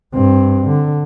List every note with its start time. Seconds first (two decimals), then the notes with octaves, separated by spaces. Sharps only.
0.13 G2 C4
0.66 D3